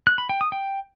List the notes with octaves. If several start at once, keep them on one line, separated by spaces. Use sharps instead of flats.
F#6
B5
G5
D#6
G5